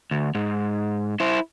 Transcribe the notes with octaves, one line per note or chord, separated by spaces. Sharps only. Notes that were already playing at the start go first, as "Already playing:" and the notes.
D2
G#2
E4 C5